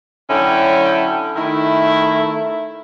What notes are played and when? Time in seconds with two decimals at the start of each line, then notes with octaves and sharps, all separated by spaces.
0.30 D3 F#3 C#4 E4 G5
1.36 D#3 A3 E4